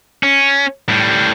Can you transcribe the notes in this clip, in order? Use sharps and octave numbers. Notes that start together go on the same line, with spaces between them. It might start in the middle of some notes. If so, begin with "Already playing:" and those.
C#4
A2 G3